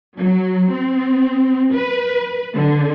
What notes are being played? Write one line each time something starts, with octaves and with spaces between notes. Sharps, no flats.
F#3
C4
B4
D3